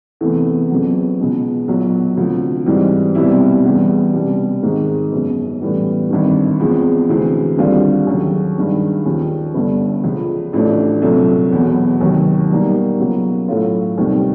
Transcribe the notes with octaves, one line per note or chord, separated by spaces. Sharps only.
E2 C3 E3 A3
F2 C#3 F#3 B3
C#2 B2 G#3
B1 A#2 F#3
D2 C3 F3
G#2 E3 G3 C4
C2 B2 G3 C4 E4
E2 C#3 E3 G3
C2 B2 G3
G#2 D#3 G#3 C4 D#4
G1 F#2 C#3
A2 E3 G3 B3
G#1 G2 D#3
E2 C#3 F3 G#3 C4
D2 C3 E3 G#3 C4
D#2 D3 G3 C4 F4
D#2 C#3 F#3
G2 D#3 G#3
D#2 C#3 F3
G1 G2 D3
C#2 C#3 F3
A1 A2 F3 A3 D4
C2 A#2 F#3 A3
E1 E2 B2 F#3
F1 D#2 D#3 F#3
B2 G3 A#3 D#4
C#2 B2 F#3 A#3
A2 F#3 A3 C#4 F4
F1 D#2 D#3 G3 C4